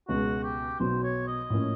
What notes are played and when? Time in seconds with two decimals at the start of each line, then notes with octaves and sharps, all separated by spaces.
0.08 C#2 B2 G#3 F#4
0.43 G4
0.80 B1 B2 F#3 C5
1.03 C#5
1.27 D#5
1.50 A2 F3 A#3 C#4